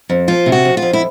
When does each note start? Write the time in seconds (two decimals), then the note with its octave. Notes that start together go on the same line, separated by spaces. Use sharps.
0.09 F2
0.28 F3 F4
0.46 C3
0.52 F#4
0.65 F2
0.77 F4
0.82 F2
0.93 E4